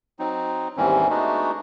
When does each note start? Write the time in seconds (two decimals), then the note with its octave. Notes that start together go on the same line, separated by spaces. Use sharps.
0.19 F#3 C4 D#4
0.77 D#2 G#2 E3 G3 C4 C#4
1.10 G#3 A3 B3 D4 D#4 F#4